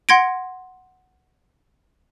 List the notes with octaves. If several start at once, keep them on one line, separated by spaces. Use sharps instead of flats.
F#5 C6 G#6 A#6 D7